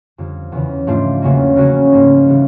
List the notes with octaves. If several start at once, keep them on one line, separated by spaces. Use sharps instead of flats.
F2 D3 G3
E2 C#3 E3
G#2 F3 A3 D4 F4
E2 C#3 F#3 A#3
C#3 F#3 A#3 C#4 F#4
G#2 F3 A#3 D#4
C#3 E3 G3 B3 D#4